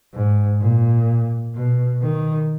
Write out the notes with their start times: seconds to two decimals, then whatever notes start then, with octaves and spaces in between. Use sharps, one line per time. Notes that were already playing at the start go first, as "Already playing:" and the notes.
0.14 G#2
0.61 A#2
1.55 B2
2.02 D#3